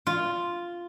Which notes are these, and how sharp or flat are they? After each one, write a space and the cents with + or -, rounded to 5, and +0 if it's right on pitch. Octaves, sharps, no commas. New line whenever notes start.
F4 -5